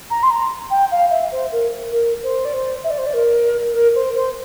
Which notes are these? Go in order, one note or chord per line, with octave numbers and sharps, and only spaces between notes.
A#5
C6
A#5
G5
F5
E5
C5
A#4
A#4
C5
D5
C5
E5
D5
C5
D5
A#4
A#4
C5
C5